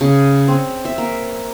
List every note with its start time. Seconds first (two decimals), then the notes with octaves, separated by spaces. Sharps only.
0.01 C#3
0.48 C4
0.85 E5
0.98 A#3